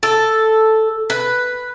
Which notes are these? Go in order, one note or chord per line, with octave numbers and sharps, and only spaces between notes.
A4
B4